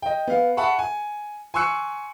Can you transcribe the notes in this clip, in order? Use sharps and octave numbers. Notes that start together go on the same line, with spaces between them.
D#5 G5
B3 F5
E5 F#5 A5 B5 C#6
G#5
G#5 C6 C#6 E6 F#6 C#7